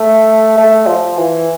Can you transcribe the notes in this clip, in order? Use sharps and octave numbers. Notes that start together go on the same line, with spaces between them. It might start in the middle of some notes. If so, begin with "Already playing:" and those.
Already playing: A3
A3
F3
E3